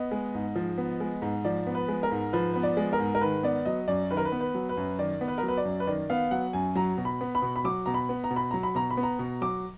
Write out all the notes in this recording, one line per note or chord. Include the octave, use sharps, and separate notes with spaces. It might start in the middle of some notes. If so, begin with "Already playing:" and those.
Already playing: B3 D#5
G#3
G#2
F3
B3
G#3
G#2
F3 D5
B3
B4
G#3
A#4
G#2
F3 B4
B3 B4
D5
G#3
A#4
G#2
A#4
D#3 B4
B3 D5
F#3 D#5
F#2 D5
D#3 B4
A#4
B4
B3
B4
F#3
B4
F#2
D#3 D5
B3
B4
A#4
F#3
B4
D5
F#2
B4
D#3 D5
B3 F5
F#3 F#5
F#2 G#5
F#3 A#5
B2
B5
B3
B5
B2
B5
F#3 D6
B2 A#5
B5
B3
A#5
B2
B5
F#3 A#5
B5
B2 A#5
B5
B3
A#5
B2
F#3 D6